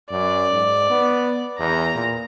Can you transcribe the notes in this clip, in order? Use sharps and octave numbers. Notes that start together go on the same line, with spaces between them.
F#2 D5
G#2
B3
E2 A#5
A#2